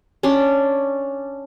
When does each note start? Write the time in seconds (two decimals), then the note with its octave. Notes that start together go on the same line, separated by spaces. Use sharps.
0.23 C#4 D4 D5 C6